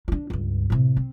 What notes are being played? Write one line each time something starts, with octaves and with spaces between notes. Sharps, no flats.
D4 F4
C#2 G2
A2 C3
C4